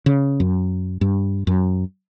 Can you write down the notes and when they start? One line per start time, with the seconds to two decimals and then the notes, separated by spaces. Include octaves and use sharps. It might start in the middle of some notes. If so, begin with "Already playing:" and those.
0.06 C#3
0.40 F#2
1.01 G2
1.47 F#2